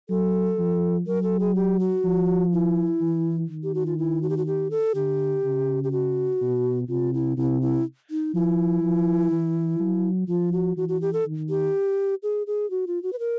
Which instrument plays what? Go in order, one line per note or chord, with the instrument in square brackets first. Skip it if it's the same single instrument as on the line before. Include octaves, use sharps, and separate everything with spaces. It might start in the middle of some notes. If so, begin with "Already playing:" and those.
[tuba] F#3 [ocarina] A4
[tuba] F3
[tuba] F#3 [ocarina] A#4
[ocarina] A4
G#4
G4
F#4
[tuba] F3
[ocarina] E4
[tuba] E3
D#3
[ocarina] G4
F#4
F4
E4
F#4
G4
F#4
G4
A4
[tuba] D3 [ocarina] G4
[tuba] C#3
[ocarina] G4
F#4
[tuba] B2
[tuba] C3 [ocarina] F4
[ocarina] E4
[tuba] C3 [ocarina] E4
[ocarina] E4
D#4
[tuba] F3 [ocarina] E4
[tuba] F3
E3
F#3
[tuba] F3 [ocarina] F4
[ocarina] F#4
[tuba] E3 [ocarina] F#4
[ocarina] F#4
G4
A4
[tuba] D#3
[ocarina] G4
G#4
G#4
F#4
F4
F#4
B4
A#4